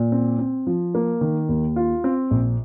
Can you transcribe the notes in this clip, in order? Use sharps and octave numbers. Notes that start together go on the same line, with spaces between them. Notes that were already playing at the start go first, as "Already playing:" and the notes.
Already playing: A#2
C4
C4
F3
A#3
D#3
D#2
F4
C4
A#1